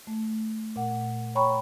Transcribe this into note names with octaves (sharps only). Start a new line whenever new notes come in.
A3
A#2 F#5
C#5 G5 A#5 B5 C#6